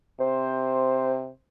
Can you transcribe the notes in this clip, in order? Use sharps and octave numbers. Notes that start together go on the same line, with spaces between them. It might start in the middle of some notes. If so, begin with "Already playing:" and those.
C3 C5